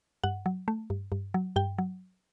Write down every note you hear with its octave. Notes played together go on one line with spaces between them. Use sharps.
G2 F#5
F#3
A3
G2
G2
F#3
G2 G5
F#3